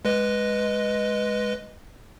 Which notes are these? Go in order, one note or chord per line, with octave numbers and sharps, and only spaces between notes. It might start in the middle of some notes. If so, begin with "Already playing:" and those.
G#3 B4 D#5